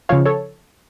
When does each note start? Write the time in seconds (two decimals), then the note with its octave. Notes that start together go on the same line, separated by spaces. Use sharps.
0.09 C#3 F3 C#5 F5
0.25 A4 C#5